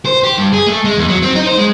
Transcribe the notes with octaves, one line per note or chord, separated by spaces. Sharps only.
C5
G4
G2
G#4
A3
G#3
E2
F#3
C4
D#4
C5
G#3